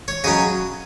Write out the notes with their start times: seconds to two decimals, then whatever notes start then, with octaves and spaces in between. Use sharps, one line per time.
0.08 C#5
0.24 C#3 F#3 C#4 D#5